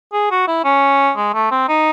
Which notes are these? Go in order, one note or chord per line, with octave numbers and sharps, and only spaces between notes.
G#4
F#4
E4
C#4
G#3
A3
C4
D#4